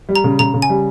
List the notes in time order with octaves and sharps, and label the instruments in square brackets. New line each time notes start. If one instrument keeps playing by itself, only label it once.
[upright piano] G3
[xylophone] A#5
[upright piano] C#3
[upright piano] C#3 [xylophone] A#5
[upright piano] C#3
[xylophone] G#5
[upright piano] G3